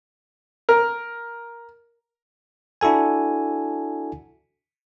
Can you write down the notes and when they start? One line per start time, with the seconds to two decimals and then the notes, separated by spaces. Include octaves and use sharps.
0.69 A#4
2.81 D4 E4 F#4 A4 G#5